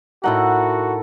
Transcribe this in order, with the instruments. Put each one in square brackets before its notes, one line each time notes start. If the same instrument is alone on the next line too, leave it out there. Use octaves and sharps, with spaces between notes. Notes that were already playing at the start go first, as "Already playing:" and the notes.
[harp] A2 D#4 F#5 [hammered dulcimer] E4 A4 A#4 [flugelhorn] F#4